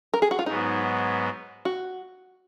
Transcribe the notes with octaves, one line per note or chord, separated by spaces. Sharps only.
A#4
G#4
F#4
F4
G#2 F#3 B3 D#4
F#4